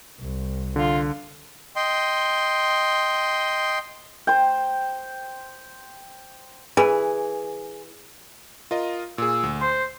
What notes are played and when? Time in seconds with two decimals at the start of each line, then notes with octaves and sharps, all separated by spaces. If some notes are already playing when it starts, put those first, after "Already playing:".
0.20 C2
0.76 D3 F4
1.76 D#5 G5 C6
4.27 C5 G5
6.77 E3 G#4
8.71 F4 A#4 D#5
9.18 A#2 G#4 E6
9.43 D2
9.61 C5 C6